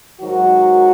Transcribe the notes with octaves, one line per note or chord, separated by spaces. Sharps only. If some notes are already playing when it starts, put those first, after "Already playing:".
G#2 D#3 F#3 F#4